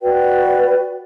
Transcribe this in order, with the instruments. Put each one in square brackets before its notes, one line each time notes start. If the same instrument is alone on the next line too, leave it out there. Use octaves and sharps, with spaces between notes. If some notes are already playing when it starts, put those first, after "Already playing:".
[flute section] F#4 B4 D5 G5